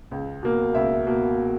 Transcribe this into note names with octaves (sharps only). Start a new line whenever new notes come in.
C#2
B2 A#3
C#2 E5
B2 A#3